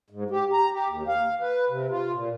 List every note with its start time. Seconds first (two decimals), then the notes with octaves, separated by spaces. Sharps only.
0.10 G#2
0.31 G4
0.53 A#5
0.73 G4
0.88 D#2
1.08 F5
1.41 B4
1.69 C3
1.90 F4
2.13 A#2